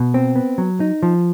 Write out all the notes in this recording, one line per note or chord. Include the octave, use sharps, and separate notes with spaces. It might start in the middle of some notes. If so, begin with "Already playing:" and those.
Already playing: B2
C4
B3
F#3
D#4
F3